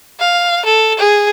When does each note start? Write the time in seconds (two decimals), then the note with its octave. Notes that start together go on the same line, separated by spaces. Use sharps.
0.19 F5
0.65 A4
0.98 G#4